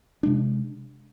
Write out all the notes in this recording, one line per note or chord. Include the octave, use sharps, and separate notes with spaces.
C3 G#3 D4